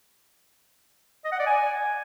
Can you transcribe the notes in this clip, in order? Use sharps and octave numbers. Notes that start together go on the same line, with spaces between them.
D#5
F#5
D5
G#5